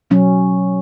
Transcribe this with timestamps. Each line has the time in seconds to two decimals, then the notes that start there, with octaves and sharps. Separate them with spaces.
0.10 B2 F#3 C#4